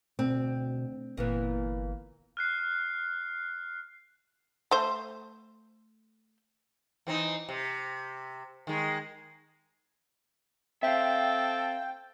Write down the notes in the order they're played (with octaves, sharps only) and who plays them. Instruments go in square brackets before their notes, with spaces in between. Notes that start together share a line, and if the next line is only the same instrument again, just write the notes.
[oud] D2 [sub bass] B2 [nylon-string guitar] C4
[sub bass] G1 [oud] A#2 E3 B3
[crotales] F6 F#6 C7
[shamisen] A3 C5
[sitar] E3 C4 D#4
C3
D#3 G#3
[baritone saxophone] C4 [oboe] A4 [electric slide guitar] E5 F5 [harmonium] G5